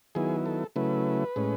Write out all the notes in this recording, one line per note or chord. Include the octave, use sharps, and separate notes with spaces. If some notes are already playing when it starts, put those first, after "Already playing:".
D#3 F#3 B3 E4 G#4
A4
C#3 F#3 A3 E4 B4
A2 G#3 C#4